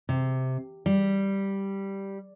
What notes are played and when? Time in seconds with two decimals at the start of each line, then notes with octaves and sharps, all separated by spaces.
0.09 C3
0.86 G3